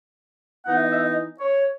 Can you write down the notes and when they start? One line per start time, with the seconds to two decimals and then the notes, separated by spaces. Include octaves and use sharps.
0.66 E3 B3 D#4 F#5
0.74 E5
0.82 D#5
0.92 E5
1.02 D#5
1.40 C#5